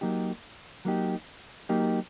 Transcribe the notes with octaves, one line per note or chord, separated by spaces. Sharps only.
F#3 A#3 D#4 G4
F#3 A#3 D#4 G4
F#3 A#3 D#4 G4